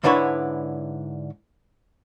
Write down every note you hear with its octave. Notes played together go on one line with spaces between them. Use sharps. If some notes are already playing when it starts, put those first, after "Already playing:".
G#2 D3 D4 E4 B4 C#5